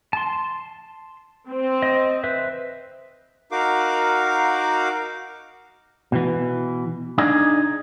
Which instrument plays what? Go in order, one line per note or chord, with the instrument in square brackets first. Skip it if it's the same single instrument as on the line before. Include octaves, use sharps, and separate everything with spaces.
[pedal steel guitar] A5 C6
[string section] C4
[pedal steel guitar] D#5
B4 C5 E5
[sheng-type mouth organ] D#4 F#4 A#4 F5 D6
[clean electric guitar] B2 E3
D4 D#4 G#4